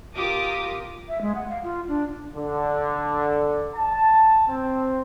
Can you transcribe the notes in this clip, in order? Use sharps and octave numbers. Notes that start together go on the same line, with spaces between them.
F4 G4 A#4 D6 D#6
E5
G#3
F#5
F5
F4
D4
D3
A5
C4